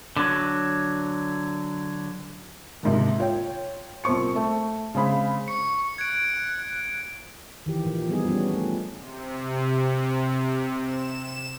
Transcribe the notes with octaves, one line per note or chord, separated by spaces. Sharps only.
D3 F#3
D#2 G#2 C3
F4 C#5 G5
C2 A#2 C4 C#6 C#7
A3
C#3 G#3 C4 G#4 B5
C#6 C#7
F#6 G#6 D7
D#3 E3 G4
A#2 F3
F3 G3 B3 D#4 G#4
G3 B3 C#4 D4
A3
C3
E7